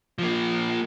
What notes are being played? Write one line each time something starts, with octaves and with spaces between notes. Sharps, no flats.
F3 A#3